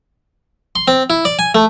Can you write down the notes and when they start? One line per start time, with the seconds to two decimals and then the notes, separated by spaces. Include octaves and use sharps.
0.76 C6
0.88 C4
1.10 E4
1.25 D5
1.39 G#5
1.55 A3